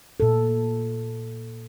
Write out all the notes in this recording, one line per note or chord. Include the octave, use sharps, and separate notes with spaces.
A#2 A4